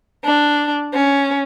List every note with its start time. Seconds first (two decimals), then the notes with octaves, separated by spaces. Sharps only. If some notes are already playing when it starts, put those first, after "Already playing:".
0.24 D4
0.94 C#4